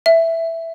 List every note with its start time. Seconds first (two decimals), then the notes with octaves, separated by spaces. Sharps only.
0.06 E5